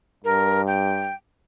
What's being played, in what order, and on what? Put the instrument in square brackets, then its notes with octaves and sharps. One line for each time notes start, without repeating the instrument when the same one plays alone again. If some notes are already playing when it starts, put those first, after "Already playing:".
[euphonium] G2 [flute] A#4
[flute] G5